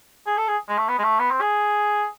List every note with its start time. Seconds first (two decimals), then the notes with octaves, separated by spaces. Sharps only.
0.26 G#4
0.37 A4
0.48 G#4
0.69 G#3
0.78 A3
0.88 B3
0.99 G#3
1.04 A3
1.19 B3
1.31 C4
1.41 G#4